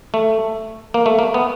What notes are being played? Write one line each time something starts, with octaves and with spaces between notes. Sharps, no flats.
A3
A#3
A3
A#3
B3